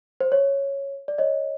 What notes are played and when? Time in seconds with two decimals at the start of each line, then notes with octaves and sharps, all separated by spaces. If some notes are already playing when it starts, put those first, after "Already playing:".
0.20 C5
0.32 C#5
1.08 D5
1.18 C#5 D#5